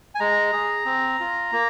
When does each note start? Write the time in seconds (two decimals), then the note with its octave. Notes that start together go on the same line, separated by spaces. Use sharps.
0.15 G#5
0.20 G#3 A#5
0.53 G#4
0.85 C4
1.20 F4
1.52 A#3